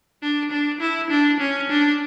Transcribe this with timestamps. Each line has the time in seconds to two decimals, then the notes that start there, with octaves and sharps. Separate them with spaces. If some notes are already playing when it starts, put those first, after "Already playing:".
0.22 D4
0.51 D4
0.81 E4
1.10 D4
1.40 C#4
1.70 D4